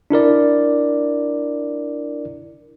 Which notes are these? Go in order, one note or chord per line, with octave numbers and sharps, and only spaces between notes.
D4 E4 A#4 D5